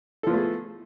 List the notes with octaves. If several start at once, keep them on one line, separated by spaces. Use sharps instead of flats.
F3 A3 B3 G#4 A4